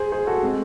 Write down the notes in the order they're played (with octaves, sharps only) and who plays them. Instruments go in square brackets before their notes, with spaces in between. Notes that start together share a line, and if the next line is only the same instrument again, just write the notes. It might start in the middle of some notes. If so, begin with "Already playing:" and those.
Already playing: [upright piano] G#4 C5
G#4 C5
F#4 A4
G#3 C4